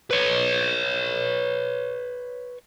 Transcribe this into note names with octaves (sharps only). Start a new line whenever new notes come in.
B4 C#5